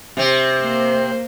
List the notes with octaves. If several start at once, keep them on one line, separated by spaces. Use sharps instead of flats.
C3 C4
A#3 C5